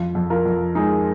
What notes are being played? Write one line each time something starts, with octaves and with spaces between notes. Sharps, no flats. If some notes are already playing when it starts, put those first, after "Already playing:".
Already playing: F2 F4
F2
F4 A#4
F2
G#3 D#4 G#4